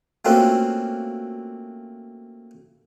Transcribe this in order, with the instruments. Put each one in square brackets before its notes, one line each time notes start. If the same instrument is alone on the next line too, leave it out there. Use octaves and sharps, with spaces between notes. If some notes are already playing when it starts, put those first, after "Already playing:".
[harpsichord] A3 A#3 C4 C#4 F4 F#4